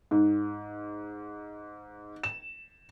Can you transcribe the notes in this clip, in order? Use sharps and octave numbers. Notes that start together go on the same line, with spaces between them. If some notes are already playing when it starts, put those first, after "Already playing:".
G#2
E7